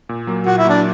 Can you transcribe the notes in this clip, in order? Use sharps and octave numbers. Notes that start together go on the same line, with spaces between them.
A#2
F#3 A#3
A#2 F#4
E4
F#3 A#3 D4